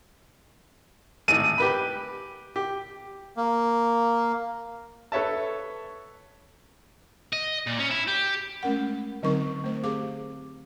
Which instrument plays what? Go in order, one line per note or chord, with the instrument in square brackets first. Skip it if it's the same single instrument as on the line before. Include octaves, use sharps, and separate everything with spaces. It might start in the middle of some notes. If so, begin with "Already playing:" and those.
[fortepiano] G#1 A2 [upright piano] D#7
[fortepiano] G4 B4 B5
G4
[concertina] A#3
[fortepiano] A4 B4 C#5 E5 A5
[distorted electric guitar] D#5
A#2
C#4
E4
G4
[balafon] G#3 A3 C#4 A#4 F#5
D3 F#3 C4 D#4 A#4 C#6
A3 C5
C4 G4 G#4 F5 D6